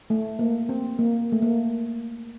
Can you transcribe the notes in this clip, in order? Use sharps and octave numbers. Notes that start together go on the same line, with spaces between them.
A3
A#3
C4
A#3
A3
A#3